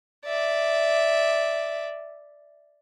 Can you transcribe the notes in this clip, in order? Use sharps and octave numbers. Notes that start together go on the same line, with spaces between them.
D5 E5